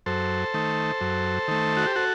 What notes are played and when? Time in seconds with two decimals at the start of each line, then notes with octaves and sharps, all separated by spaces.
0.06 F#2 A4 C5
0.54 D#3 A3
1.01 F#2
1.48 D#3 A3
1.77 F#4
1.86 G4
1.96 F#4 A4